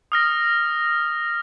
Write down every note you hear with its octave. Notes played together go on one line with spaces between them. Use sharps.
D#6 F6 A#6